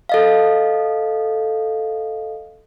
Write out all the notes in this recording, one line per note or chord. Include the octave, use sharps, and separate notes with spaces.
A4 D#5 F5